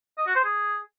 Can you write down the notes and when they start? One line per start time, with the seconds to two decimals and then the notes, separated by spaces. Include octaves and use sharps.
0.18 D#5
0.27 F#4
0.36 C5
0.45 G#4